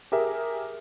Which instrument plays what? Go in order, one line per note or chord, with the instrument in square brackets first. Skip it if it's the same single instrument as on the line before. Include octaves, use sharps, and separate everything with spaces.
[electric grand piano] G4 G#4 A#4 E5